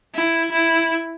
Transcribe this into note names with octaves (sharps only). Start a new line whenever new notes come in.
E4
E4